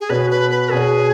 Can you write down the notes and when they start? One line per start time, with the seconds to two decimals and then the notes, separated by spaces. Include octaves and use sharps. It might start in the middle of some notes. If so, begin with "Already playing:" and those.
0.01 G#4
0.09 B2 B3 F#4 B4 C#5
0.31 B4
0.51 B4
0.71 B2 B3 F#4 G#4 C#5